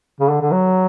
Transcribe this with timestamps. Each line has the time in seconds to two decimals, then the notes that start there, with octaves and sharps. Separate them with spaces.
0.20 C#3
0.30 D3
0.41 D3
0.51 F#3